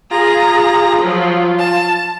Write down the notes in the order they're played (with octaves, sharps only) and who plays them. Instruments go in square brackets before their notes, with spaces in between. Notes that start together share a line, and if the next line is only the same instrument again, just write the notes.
[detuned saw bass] F4 [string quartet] G#4 A#5
[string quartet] F3 F#3
A5